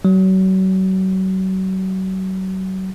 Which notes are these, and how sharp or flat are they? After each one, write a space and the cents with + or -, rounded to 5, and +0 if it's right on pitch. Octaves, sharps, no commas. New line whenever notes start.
F#3 +35